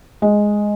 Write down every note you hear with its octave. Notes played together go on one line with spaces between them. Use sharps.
G#3